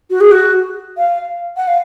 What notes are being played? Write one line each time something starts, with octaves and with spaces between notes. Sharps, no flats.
F#4
G#4
F#4
F5
F#5
F5